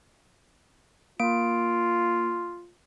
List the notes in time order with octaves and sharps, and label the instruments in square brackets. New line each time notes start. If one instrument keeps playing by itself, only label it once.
[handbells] A#3 D7 [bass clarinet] F4